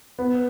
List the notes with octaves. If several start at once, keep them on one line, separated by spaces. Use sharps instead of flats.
B3